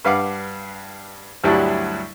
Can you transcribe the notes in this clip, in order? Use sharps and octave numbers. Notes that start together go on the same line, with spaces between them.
G2 B4 F5 F#5 D6
D2 G2 F#3 G3 D4 E4